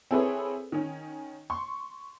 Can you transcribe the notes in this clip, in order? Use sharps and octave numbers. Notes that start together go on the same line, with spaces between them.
C4 E4 G#4 A4 B4 C#5
D#3 C#4
C6 C#6